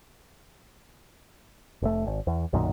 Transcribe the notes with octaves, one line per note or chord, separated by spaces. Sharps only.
F1 A3
G#1
E2
B1 F#2 A#2 D#3